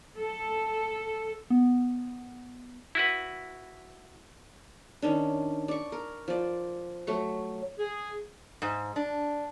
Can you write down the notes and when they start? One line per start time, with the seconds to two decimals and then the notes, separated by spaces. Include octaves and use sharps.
0.16 A4
1.50 B3
2.95 E4 F#4 B4
5.02 D#3 C#4 D4
5.68 D5 C#6
5.92 A#4
6.28 F3 D5
7.07 F#3 A3 C#6
7.79 G#4
8.62 G#2
8.96 D4